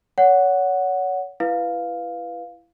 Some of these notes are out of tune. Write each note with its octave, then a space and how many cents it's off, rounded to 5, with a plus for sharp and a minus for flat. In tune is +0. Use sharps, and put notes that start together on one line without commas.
C#5 +30 F#5 +0
E4 +20 B4 +0 F5 +0